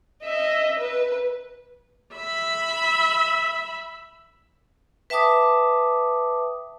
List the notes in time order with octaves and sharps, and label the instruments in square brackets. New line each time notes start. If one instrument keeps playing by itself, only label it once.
[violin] D#5 E5
B4
[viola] E5 B5
[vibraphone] B4 E5 G5 A5 D6 D#6